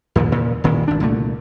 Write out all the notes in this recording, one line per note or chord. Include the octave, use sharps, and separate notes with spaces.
D#2 A#2 D3 F3
A#2 C#3 E3
D#1 A#2 D#3 E3
G#1 D4
C2 A#2 D3 A3